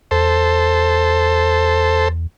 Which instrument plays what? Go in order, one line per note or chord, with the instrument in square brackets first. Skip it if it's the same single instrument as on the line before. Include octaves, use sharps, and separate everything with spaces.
[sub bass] E2 [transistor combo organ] A4 C5